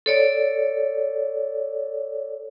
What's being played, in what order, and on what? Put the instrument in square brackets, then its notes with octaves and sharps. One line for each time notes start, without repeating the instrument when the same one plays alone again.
[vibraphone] A4 C#5 D5